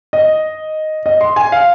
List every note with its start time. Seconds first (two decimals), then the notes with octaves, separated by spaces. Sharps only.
0.13 D#5
1.06 D#5
1.21 C6
1.36 G#5
1.52 F5